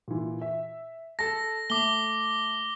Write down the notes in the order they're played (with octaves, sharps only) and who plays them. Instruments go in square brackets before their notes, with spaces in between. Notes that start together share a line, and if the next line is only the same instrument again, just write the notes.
[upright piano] A#2 E3
E5
[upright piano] A4 A5 [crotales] A#6
[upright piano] A3 [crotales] D6 G7